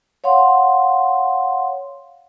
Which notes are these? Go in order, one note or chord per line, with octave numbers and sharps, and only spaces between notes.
C#5 F5 F#5 C6